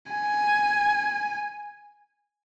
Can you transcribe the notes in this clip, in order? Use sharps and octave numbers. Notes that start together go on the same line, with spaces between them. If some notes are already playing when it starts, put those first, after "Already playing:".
G#5